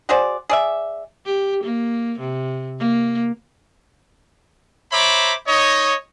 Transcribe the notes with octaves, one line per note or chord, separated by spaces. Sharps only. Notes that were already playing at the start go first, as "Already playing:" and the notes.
F#4 G#4 C5 D5
G#4 D5 E5
G4
A#3
C3
A#3
C5 C#5 E5 A#5 B5 D6
D#4 C#5 D#5